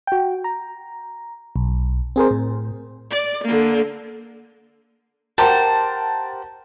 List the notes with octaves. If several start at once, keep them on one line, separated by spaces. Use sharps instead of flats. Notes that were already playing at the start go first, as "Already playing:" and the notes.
F#4 G5
A#5
B1
C4 G#4 A#4 C5
A2
D5
D3 A#3
G4 A#4 C5 F#5 A5